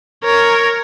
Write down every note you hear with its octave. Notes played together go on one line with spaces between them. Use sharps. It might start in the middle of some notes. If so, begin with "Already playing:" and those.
A#4 C#5